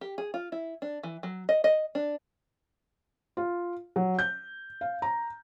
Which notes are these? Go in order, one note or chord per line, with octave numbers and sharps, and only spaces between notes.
G4
G#4
F4
E4
D4
E3
F#3
D#5
D#5
D4
F4
F#3
G6
F5
A#5